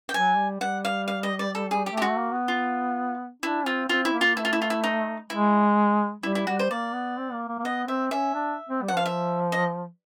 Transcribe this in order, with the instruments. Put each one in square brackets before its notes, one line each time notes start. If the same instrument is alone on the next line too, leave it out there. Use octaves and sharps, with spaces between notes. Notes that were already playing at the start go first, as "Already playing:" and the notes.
[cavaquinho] G5
[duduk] F#3 [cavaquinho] G#5
[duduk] G3
[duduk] G3 [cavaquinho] F#5
[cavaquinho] F5
F5
D#5
D5
A4
G#4
G4
[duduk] A3
[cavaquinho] G4
[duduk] G#3 [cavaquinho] F#4
[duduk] A3
A#3
B3
[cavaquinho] F4
[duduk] D4 [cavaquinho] E4
[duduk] C4 [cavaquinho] F4
[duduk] C4 [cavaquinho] F4
[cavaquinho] E4
[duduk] A#3
[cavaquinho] F4
[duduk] A3 [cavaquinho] E4
[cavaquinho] F4
E4
F4
E4
D#4
[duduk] G#3 [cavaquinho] E4
[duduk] G3 [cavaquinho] E4
[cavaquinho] E4
[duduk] G3 [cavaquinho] F#4
[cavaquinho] C5
[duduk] A#3 [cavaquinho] D5
[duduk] B3
C4
A#3
A#3
A#3
[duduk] B3 [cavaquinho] D#5
[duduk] C4 [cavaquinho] E5
[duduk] C#4 [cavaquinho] E5
[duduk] D4
C4
G3
[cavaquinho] F#5
[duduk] F3 [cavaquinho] F5
[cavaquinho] E5
D#5